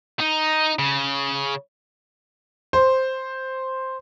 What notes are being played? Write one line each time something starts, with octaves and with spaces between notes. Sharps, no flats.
D#4
C#3
C5